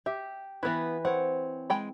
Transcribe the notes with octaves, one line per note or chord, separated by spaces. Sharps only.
G4 E5
E3 B3 E4 B4
C4 C#5 F#5
G#3 G5 B5